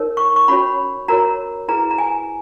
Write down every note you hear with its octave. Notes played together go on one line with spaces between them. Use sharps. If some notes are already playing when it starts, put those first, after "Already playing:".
Already playing: D#4 A#4 C#5
C#6
C#6
C#4 F#4 C#5 B5
F#4 A#4 C#5 A#5
E4 G#4 B4 A#5
A#5
G#5